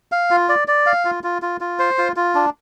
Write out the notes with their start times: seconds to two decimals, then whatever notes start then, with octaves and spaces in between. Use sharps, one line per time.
0.12 F5
0.31 F4
0.49 D5
0.68 D5
0.86 F5
1.05 F4
1.24 F4
1.42 F4
1.61 F4
1.79 C5
1.98 F4
2.16 F4
2.35 D4